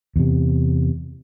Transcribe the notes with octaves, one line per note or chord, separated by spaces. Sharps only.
E2 C3